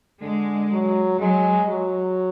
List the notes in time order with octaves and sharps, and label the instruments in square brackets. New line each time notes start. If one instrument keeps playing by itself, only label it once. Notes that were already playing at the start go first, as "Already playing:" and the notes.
[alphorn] D3 [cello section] G#3
[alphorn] F#3
[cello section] F#3 [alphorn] G#3
[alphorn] F#3